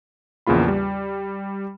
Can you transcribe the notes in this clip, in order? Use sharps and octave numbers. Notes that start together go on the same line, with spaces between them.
A#1 E2 C#3 A#3 F4 B5
G3